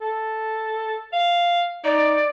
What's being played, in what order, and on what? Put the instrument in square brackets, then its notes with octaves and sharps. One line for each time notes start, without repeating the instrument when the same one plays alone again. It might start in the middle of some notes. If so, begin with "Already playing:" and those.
[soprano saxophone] A4
F5
[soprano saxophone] D#4 [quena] D5